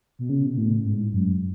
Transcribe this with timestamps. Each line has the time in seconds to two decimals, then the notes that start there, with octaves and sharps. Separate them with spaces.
0.19 B2
0.29 C#3
0.46 B2
0.57 A2
0.84 G#2
1.12 F#2